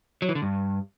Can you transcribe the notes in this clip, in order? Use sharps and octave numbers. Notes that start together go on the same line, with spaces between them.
F#3
E3
D3
G2